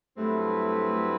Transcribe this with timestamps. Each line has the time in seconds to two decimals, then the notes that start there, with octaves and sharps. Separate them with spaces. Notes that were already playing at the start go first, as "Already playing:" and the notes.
0.17 G2 F#3 A3 C4 E4 B4